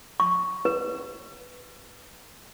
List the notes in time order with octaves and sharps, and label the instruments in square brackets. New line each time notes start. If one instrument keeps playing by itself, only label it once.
[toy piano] C#6
B4